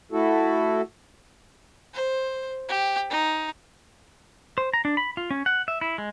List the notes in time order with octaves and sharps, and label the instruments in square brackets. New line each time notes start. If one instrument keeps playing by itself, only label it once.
[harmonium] A3 E4 F#4 A4
[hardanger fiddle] C5
G4
D#4
[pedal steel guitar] C5
A#5
D4
B5
F4
C#4
F#5
E5
E4
G#3